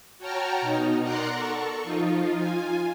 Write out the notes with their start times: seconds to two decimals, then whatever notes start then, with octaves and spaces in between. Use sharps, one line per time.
0.19 F#4 C#5 G5 A5 A#5 F6
0.61 B2 D#4
1.02 A#4 D5 F#5 A#5 C6 F#6
1.35 A4 C#6
1.83 F3 D#4 F4
2.38 F4 G#5